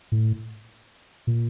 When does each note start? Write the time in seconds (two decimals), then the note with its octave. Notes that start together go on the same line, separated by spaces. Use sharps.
0.12 A2
1.27 A#2